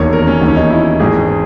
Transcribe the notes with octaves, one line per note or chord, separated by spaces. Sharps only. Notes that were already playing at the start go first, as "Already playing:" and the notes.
Already playing: E1 D#2 D#3 C#5
A#4
C#4
E1 D#2 D#3
C#4
D#4
E4
G#1 G#2 E3 G#4